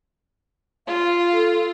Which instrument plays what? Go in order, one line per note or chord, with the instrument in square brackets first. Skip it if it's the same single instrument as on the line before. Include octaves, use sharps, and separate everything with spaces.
[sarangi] F4 [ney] F5
[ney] A4